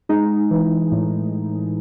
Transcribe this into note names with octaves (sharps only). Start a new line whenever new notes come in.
G#3 D#4
E3
A2